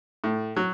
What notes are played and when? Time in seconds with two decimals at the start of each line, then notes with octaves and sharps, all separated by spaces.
0.24 A2
0.56 F#3